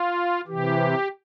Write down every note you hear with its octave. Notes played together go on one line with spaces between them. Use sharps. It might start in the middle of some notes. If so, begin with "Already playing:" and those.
Already playing: F4
C3 E3 G4